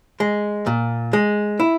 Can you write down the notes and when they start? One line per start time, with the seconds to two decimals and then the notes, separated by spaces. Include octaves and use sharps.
0.20 G#3
0.67 A#2
1.13 G#3
1.60 E4